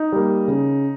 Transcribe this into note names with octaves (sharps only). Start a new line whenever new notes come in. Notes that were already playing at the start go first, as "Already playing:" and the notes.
Already playing: D#4
G3 A#3
C#3